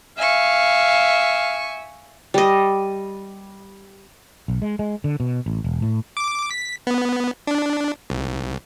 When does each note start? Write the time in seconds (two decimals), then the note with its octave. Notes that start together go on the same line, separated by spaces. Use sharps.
0.18 E5 F5 G#5 C#6
2.34 G3 D#5
4.48 B1
4.62 G#3
4.79 G#3
5.04 D3
5.20 B2
5.46 A1
5.64 E1
5.82 A2
6.17 D6
6.51 B6
6.87 B3
7.47 D4
8.10 C2